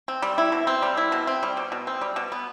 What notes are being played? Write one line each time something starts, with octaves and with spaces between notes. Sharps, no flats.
C4
G3
E4
B2
C4
G3
E4
B2
C4
G3
B2
B2
C4
G3
B2
B3